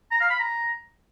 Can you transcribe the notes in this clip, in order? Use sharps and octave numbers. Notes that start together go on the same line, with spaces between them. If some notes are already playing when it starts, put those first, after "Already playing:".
A#5
F5
B5
A#5